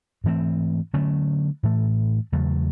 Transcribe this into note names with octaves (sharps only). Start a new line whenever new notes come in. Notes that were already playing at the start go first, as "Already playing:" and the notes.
G#2 E3 A3 C4
D3 F#3 A3 C#4
A2 E3 A3
E2 C#3 F#3 A3